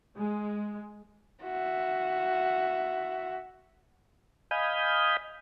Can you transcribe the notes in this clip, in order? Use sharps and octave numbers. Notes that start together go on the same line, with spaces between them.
G#3
F#4 E5
D#5 F5 G#5 B5 D#6 G6